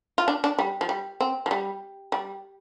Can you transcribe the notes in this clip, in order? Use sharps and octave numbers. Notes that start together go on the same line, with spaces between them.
F4
D4
D4
G3
F3
G3
C4
F3
G3
G3